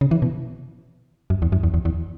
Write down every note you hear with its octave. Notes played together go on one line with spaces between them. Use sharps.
C#3
E3
B2
F#2
E2
F#2
E2
E2
E2